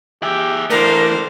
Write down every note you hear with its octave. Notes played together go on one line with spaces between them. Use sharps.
G4 G#4 E5
E3 A3 D4 A#4 C5 F5